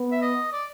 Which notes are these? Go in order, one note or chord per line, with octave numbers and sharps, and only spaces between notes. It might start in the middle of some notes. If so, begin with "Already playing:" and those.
Already playing: B3
E5
D#5
D5